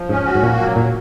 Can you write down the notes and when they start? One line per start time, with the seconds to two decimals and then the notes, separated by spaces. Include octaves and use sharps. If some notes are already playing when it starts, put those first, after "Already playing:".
Already playing: F3
0.09 G#2 C#4
0.26 F#4
0.35 G#2
0.43 A#2 A#3
0.59 F#3
0.76 A#2